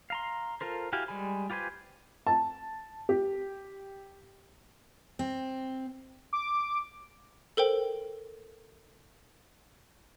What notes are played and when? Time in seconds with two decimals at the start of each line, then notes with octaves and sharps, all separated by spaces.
0.10 F5 A#5 C6
0.61 F4 A4 A#4 C5
0.93 E4 F#4 G4 F5 G#5
1.08 G3 G#3 G#5 B5
1.50 F4 G4 B4 C5 G#5
2.27 A5
3.09 G4
5.19 C4
6.33 D6
7.57 A4 A#4 C5 G5